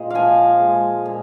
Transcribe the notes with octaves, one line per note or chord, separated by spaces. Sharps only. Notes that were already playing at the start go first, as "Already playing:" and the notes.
Already playing: A#2 G#3 C5 D#5
F3 F5 G#5
G#3
A#2